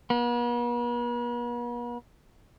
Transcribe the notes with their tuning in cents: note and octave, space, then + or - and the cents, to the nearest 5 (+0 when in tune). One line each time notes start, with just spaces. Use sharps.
B3 -45